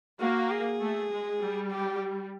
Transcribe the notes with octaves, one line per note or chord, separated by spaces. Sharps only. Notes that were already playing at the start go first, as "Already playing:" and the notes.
A#3 F#4
G#4
A3
G#3
G3
G4